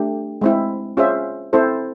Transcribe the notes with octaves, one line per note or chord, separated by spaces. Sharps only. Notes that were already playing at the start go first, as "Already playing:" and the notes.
Already playing: A3 D4 G4
G#3 C4 E4
C#4 F4 G#4 C5 E5
C4 E4 A4 C5